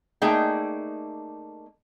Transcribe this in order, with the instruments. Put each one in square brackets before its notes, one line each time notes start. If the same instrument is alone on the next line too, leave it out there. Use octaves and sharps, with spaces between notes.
[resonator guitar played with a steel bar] A3 A#3 D#4 G#4 D5 G5